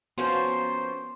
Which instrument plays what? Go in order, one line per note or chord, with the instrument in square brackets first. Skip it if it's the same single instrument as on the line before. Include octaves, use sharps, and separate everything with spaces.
[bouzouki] F3 A#3 C#4 [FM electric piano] B3 F#4 [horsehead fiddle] C5 [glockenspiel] C6